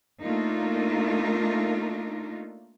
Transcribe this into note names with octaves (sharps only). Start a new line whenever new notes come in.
A3 A#3 D4 D#4 F4 A#4